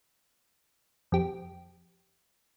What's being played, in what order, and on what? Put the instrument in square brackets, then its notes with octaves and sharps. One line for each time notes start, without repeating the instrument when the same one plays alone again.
[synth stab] F2 G4